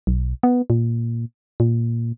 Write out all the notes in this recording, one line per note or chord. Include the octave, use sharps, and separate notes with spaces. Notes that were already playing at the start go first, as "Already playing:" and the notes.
B1
B3
A#2
A#2